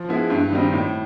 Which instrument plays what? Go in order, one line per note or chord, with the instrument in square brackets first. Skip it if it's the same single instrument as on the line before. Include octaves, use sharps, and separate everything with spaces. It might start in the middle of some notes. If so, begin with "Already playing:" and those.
Already playing: [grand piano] F3
G#3 B3 E4
G2
D#3 G3 C4 D#4
A2